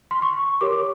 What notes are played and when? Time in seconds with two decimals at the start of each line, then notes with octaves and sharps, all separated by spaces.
0.11 C6
0.22 C#6
0.61 G4 A#4 C#5 D6